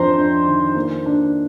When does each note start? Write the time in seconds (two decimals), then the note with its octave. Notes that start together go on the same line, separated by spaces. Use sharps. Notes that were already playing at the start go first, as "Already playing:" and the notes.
Already playing: F2 D4 C5 A#5 C6
0.16 D4
0.46 D#3
0.75 A#3
1.06 D4